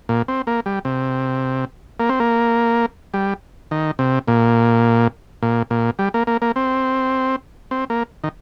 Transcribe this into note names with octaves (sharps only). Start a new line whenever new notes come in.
A#2
C4
A#3
G3
C3
A#3
C4
A#3
G3
D#3
C3
A#2
A#2
A#2
G3
A#3
A#3
A#3
C4
C4
A#3
D#3